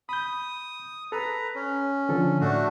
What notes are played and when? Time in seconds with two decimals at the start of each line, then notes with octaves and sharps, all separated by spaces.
0.09 B5 D#6 G6
1.12 A4 B4 A#5
1.55 C#4
2.09 D3 F3 A4
2.41 A2 A3 D4 F#4